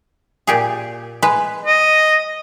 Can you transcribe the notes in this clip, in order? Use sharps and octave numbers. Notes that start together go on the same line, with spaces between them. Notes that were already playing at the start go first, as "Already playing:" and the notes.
A#2 G4 G#4
G#3 B4
D#5